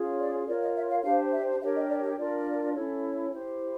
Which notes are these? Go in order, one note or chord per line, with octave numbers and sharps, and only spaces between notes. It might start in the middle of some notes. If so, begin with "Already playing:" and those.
Already playing: C#4 F4 G#4 C#5
D5
F4 A#4 C#5 D5
D#5
E5
F5
D4 G4 C5 F5
E5
D4 G4 A#4 C#5 E5
D#5
D5
D#5
D4 F4 A#4 D5
C#4 E4 A4 C#5
E4 G4 C5